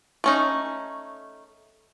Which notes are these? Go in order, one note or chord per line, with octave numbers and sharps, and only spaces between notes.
A3 C#4 D#4